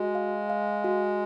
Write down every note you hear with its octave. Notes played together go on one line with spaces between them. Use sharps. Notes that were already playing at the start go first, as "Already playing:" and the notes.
Already playing: G#3 F#4
F5
F5
F#4